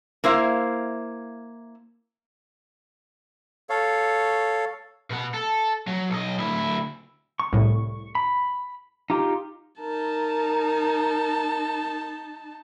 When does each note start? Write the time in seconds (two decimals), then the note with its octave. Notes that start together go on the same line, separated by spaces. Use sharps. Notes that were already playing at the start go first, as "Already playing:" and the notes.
0.24 A#3 E4 C5 F5
3.70 A4 C#5 F5
5.10 B2 F#5
5.34 A4
5.87 F#3
6.10 B1 D#5
6.38 D2 E4
7.40 C#6
7.53 C2 A2
8.15 B5
9.10 D#4 F4 G4
9.81 D#4 A#4 A5